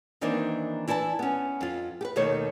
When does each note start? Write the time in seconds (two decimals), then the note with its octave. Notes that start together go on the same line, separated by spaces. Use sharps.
0.21 D#3 E3 A#3 C4 D4 D#4
0.88 E3 E4 D5 G5 A5
1.19 B3 C#4
1.61 F2 F4
2.01 G4 B4
2.16 D#2 B2 D#3 A3 C#5